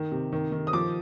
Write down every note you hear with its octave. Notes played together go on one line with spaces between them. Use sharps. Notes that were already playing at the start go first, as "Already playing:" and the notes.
Already playing: D#3
C3
D#3
D#3
D#6
F3 D6